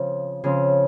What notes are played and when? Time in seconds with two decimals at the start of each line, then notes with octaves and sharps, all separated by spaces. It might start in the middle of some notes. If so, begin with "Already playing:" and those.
Already playing: C#3 F3 C4
0.44 C#3 F3 C4